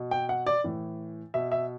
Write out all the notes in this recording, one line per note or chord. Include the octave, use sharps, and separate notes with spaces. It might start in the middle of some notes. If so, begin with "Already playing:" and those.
Already playing: B2
G5
F#5
D5
A2 E3
B2 E5
E5